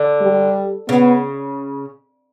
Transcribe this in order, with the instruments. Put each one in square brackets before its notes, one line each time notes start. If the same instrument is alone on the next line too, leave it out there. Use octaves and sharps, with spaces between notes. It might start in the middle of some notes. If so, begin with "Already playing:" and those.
Already playing: [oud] D3
[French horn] G3
[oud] C#3 [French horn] B3